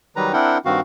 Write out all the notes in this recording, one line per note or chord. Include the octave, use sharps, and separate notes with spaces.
D#3 F#3 G3 B4 A#5
C4 D4 E4 A#4 F#5 G5
G2 D#3 C4 F#4 F5